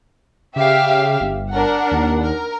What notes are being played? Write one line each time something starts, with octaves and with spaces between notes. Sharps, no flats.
C#3 G4 E5 F5
G1
D4 A#4 F#5
D#2
A#4